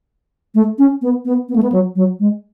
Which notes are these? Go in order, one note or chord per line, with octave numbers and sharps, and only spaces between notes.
A3
C#4
B3
B3
B3
A3
B3
F#3
F#3
G#3